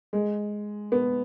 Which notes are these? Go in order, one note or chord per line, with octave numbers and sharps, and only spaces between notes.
G#3
B3